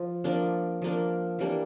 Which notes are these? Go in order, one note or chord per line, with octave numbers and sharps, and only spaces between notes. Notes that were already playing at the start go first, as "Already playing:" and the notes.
Already playing: F3
F3 A#3 D4
F3 A#3 D4
E3 G3 A#3 D4